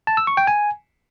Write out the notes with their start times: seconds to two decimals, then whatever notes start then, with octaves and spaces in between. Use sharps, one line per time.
0.07 A5
0.17 E6
0.27 C#6
0.37 G5
0.47 G#5